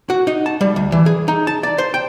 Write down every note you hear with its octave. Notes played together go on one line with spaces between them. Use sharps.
F#4
D#4
A5
G3
D2
E3
G#4
D#4
A5
D5
C5
G5